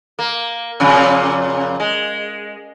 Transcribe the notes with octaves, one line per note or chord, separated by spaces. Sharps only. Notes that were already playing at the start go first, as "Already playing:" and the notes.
A#3
F2 A#2 C#3
G#3